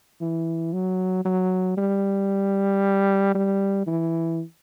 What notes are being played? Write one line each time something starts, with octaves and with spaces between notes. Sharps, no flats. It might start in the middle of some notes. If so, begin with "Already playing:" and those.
E3
F#3
F#3
G3
G3
E3